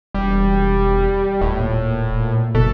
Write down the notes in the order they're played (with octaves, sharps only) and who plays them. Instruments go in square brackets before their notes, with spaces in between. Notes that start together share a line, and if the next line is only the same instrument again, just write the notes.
[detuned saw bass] E1 [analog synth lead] G3
[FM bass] D#1 [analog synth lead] A2
[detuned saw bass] A#2
[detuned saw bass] F#1 [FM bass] B2 [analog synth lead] A4